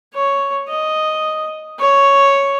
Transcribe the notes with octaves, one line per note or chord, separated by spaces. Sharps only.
C#5
D#5
C#5